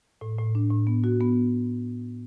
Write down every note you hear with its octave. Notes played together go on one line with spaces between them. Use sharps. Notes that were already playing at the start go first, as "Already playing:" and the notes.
A2
A2
D4
A2
B3
F#4
B3